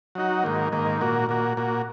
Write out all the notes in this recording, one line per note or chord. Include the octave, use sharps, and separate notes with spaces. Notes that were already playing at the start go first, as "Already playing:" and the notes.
F#3 D#4 F#4
G#2 D#3 A#3
G#2 D#3 A#3
A#2 A#3 F#4
A#2 A#3 F#4
A#2 A#3 F#4